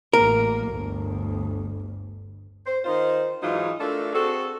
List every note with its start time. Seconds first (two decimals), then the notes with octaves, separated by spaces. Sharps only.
0.13 A1 A#3 A#4
0.68 G1 D2
2.66 C5
2.84 D#3 D#4 F4 C5
3.41 G#2 E3 F#3 D#4 F4
3.78 A3 D4 F4 A4 A#4
4.13 C4 F#4 G#4 A4